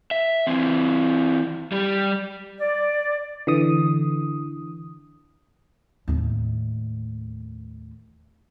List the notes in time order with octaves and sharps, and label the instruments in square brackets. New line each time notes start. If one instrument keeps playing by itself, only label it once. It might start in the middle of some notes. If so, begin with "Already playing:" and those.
[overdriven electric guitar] E5
E3 C4
G3 G4
[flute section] D5
[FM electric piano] D3 E3 D#6
[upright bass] D#2 A2